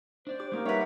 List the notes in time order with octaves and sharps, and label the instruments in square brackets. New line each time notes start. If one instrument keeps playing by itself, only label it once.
[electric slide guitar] D4 D5 [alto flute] C5
[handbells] G4 D6
[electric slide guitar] G#3 C#4 D#4 [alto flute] A#3 [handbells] D6 G6
[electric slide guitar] G3 G4 A#5 [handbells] D#4 E5 F#5 [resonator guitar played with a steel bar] B4 C#5